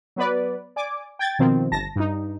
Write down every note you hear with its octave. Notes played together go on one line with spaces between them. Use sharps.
F#3 B3 B4 D5
D5 G#5 D6
G5 G#6 A6
B2 D#3 F3 C4
G1 A5 A#6
G2 D#4